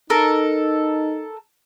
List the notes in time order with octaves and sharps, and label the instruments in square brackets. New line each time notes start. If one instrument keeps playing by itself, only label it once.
[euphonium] D#4 [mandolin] A4 A#4